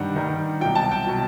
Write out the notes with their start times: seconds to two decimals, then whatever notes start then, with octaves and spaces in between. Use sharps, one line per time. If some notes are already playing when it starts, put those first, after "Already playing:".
Already playing: G2 D#3 G3 F#5
0.16 G2 D#3 G3
0.61 C2 B2 F#3 G5
0.75 A5
0.91 G5
1.07 B2 F#3